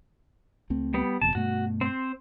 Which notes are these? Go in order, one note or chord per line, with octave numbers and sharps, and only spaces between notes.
C#2 A3 C4
G3 B3
F#1 F2 B2 A5
G2 B2 A3 F#4
C4 C5